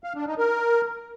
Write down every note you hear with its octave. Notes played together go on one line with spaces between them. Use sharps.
F5
D4
D#4
A#4